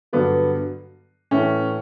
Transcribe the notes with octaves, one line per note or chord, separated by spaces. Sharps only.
G2 D3 F#3 B3
A2 E3 C#4